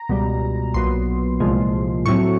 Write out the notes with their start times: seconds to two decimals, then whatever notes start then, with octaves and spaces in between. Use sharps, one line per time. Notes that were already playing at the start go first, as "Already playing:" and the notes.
Already playing: A#5
0.09 C#2 B2 G3
0.74 B1 A#2 F#3 B3 C6
1.40 C2 A#2 F3 G#3
2.06 A2 F#3 A3 C4 C#6